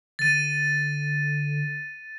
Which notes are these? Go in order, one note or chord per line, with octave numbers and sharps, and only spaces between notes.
D3 A6 D#7